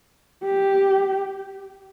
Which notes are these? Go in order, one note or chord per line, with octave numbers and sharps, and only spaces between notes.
G4